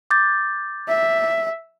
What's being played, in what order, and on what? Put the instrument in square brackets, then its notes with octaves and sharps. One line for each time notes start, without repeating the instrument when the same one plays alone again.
[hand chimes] D6 G6 A6
[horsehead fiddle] E5